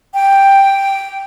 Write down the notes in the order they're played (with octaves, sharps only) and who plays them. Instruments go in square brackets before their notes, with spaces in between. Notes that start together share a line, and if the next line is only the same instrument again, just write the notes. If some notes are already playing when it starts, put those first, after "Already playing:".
[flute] G5